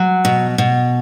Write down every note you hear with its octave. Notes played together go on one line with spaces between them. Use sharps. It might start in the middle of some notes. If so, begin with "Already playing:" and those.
Already playing: F#3
B2
B2